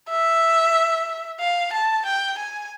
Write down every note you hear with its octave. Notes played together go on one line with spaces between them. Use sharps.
E5
F5
A5
G5
G#5